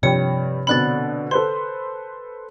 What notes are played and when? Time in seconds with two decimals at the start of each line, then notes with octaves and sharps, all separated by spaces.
0.03 G2 C3 F3 C#5 G5 C#7
0.67 B2 D3 C4 B5 F#6 A6
1.31 A4 B4 C5 C6